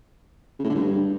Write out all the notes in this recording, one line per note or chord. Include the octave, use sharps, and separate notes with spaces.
C#3
A2
D3
G2